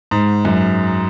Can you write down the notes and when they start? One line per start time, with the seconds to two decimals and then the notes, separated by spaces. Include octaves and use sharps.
0.11 G#2
0.45 F#2